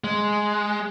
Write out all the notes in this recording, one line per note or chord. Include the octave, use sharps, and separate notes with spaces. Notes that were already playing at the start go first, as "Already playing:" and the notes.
G#3